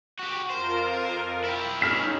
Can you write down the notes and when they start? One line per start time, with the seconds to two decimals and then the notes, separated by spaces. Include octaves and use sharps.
0.19 F#4 G4
0.51 F2 F4 A#4 C5
1.45 E4 G4
1.81 G2 C#4 D#4 F6 B6 E7